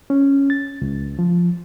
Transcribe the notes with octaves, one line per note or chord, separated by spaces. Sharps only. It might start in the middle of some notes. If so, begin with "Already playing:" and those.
C#4
A6
C#2
F3